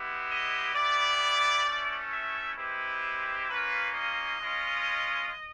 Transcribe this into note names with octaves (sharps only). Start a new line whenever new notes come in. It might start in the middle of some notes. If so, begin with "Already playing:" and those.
Already playing: G#3 B3 E4 G4
D#5
B3 E4 G4 D5
A3 C#4 E4
E5
G#3 C4 E4 G4 B4
A#3 C#4 F4 B4
D#5
G#3 C#4 F4